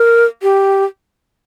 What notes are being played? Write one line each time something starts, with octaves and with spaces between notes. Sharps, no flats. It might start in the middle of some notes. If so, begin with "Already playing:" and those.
Already playing: A#4
G4